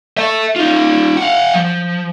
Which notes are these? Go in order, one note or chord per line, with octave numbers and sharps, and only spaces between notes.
E5 A5
D#4 F4
F5 F#5
F3